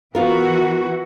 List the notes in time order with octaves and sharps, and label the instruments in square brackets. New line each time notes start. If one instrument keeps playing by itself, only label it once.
[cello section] E3 F#4 [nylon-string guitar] B3 F4 A#4